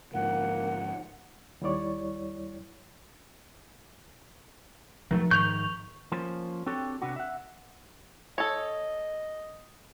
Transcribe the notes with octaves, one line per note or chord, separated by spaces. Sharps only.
G#2 D3 F3 A#3 F#5
D#2 G3 E4 C#5 D5 C#6
E1 F3 F#3 A3
G#2 D#3 C#6 G6 F7
F3 A#3 C#4 C5
C4 D4 F#4 G4 A4 C#5
C3 B3 D4 F#4
E5 F#5
A4 C#5 D#5